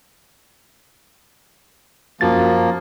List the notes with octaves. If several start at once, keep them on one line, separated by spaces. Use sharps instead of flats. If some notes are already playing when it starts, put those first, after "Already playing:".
F#2 F3 A#3 F#4 A6